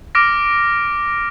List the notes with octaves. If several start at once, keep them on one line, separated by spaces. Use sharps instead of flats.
D6 F6 A#6 D7